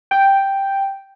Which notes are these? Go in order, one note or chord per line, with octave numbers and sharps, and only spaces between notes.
G5